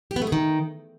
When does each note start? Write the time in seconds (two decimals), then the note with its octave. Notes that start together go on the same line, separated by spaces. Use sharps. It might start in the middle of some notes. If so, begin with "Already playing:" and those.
0.11 G4
0.16 B3
0.22 A3
0.27 G#4
0.32 D#3